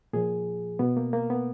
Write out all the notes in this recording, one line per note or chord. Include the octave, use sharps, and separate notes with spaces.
A#2 F3 G#4
B2 B3
A#3
A#3
B3